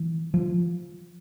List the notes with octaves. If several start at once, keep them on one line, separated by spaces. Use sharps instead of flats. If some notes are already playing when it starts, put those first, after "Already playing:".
Already playing: E3
F3